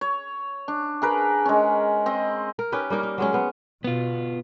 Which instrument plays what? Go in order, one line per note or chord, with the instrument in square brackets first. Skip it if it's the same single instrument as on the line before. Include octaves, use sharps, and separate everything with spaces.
[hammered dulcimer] C#5
D4
G#4 A#4 B4
G#3 C#4
C4 D#5
[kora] A#4
C#4 D#4 G4 B4
G3 A#3 D#4 A#4
D#4
F#3 G#3 C#4
B3 G#4
[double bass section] B2 [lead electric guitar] B3 F4